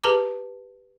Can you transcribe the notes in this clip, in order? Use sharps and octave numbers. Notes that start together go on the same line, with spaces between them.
G4 G#4 B4 A5 A#5 D6